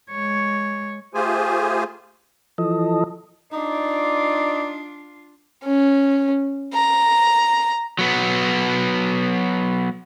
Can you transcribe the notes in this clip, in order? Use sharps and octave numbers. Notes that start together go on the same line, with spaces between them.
G#3 C#5
A3 F4 G4 G#4 C5 G#5
E3 F3 A4 D#5
D4 D#4 F4 D5
C#4
A#5
F#3 B3